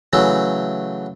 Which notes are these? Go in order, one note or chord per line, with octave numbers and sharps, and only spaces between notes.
C#3 E3 F#3 A3